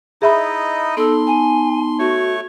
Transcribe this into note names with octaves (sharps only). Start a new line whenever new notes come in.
D#4 E4 G#4 D#5 E5 B5
B3 D#4 A4 A5 C6
G#5
A3 F#4 C#5 C#6